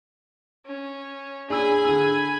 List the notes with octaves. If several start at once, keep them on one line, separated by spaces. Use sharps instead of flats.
C#4
D4 G#4 G#5 B5 E6
D3 E6